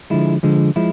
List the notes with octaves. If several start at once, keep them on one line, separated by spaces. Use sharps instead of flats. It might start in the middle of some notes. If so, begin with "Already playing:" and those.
D3 F3 G#3 E4
D3 F3 G#3
F3 G#3 E4